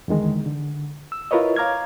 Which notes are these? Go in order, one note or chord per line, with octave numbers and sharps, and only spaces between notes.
E2 D3 D#3 G#3
D3
E6
E4 F4 A#4 B4 C#5 D#5
C#5 F5 A#5 D6 F6 G#6